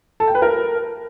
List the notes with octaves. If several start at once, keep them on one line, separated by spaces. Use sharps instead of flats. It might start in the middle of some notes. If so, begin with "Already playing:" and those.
A4
G5
B4
A#4